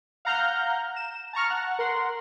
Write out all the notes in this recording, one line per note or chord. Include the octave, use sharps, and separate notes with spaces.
F5 F#5 A#5 F6 G6
E7
A5 A#5 C#6 F6
F#5
A#4 F#5 C6